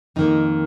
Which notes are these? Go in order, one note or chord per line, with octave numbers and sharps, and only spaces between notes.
F2 D#3 A#3 D#4